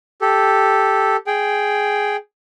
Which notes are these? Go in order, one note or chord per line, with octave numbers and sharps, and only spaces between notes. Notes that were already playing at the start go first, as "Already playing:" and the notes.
G4 A4
G#4 G5